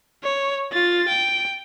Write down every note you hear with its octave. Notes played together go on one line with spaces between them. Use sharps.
C#5
F4 A6
G5